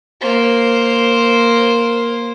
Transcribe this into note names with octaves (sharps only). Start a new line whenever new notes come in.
A#3 C5